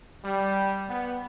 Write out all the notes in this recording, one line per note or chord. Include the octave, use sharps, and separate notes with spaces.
G3
B3